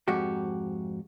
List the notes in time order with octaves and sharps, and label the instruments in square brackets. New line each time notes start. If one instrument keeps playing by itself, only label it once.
[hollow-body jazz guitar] F2 G#2 F#4 G4